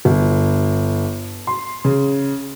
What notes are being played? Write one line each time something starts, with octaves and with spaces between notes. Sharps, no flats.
G1
C6
C#3